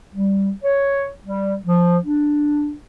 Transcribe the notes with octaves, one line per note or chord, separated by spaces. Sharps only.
G3
C#5
G3
F3
D4